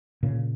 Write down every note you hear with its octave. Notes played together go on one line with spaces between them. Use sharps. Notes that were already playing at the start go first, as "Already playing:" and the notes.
A#2 C#3